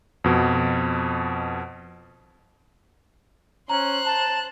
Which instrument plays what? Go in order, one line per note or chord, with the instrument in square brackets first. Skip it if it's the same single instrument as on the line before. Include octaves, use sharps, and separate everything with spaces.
[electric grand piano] F2 B2
[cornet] C#4 [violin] C5 F#6 [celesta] A#5
[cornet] A5